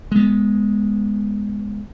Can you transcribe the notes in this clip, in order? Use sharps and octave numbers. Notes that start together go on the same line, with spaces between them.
G#3 B3